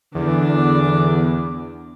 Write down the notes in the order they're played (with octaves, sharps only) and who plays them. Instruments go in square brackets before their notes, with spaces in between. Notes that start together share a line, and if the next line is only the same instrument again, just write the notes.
[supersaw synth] E2 [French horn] D3 [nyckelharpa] D4 D6